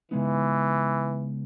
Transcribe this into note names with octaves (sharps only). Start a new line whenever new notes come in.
C#3 E3 G#3 B3 D#4